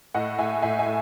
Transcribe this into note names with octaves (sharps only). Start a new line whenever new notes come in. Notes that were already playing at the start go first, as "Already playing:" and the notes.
A2 D#5 F#5
A2 E5 G#5
A2 E5 G#5
E5 G#5
A2